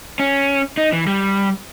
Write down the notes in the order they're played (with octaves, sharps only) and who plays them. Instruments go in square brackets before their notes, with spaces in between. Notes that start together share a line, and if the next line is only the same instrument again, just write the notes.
[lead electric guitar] C#4
D#4
E3
G3